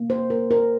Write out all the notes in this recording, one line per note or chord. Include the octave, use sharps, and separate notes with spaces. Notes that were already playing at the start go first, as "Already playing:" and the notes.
Already playing: C3 A#3
C5
A#4
A#4